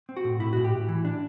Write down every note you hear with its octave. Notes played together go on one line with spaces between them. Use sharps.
C4
F#4
A2
A2 E4
F#4
A2
G4
A2
E3
D4